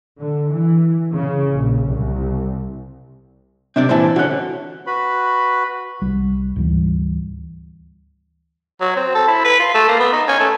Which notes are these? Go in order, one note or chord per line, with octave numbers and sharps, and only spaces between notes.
D3
E3
C#3
A#1
C2
C3 C4 D4 D5
A#2 E3 E4 C5 A5
D3 C#4 F#4 F#6
F#4 B4 B5
C2 G3
D2 G#2 E3 G3
F#3
C4
A4
E4
B4
F4
A3
A#3
B3
D#4
C#4
A3